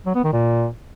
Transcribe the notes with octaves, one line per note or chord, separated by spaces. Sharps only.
F#3
B3
D#3
A#2